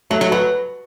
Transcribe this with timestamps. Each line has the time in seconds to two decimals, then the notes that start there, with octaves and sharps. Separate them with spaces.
0.10 F#3 A3
0.21 F#3
0.32 F#3 B4